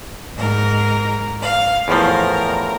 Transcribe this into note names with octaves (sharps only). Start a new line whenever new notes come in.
G#2 A#4
F5
E2 A2 F3 A#4